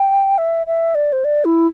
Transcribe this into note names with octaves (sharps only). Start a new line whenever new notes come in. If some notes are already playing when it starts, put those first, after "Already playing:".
Already playing: G5
E5
E5
D5
C5
D5
E4